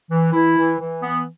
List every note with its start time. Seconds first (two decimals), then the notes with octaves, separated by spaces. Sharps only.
0.10 E3
0.33 E3 E4
0.56 E3
0.79 E3
1.02 B3